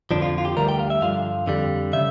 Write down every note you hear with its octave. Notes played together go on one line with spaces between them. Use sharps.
F2 D3 F3 D4
F4
F4
G4
D2 D3 G3 A#4
G5
F5
E5
G2 D3 F3 F5
F2 D3 G3
C#3 E5